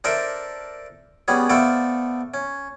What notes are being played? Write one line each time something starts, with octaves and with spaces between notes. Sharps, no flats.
D4 A4 A#4 C5 D5 E5
G3 B3 C#4 G#4
A3 B3 A4 C5 D5 F5
C#4